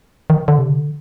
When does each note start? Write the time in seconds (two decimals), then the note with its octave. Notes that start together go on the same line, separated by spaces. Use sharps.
0.30 D#3
0.48 D3
0.58 C3
0.69 D3